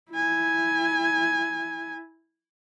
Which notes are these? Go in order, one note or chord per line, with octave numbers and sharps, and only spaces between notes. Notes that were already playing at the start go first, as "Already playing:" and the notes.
E4 G#5